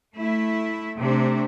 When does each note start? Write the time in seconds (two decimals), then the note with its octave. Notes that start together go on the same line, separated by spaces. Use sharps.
0.15 A3 E4
0.98 C3 A3 D4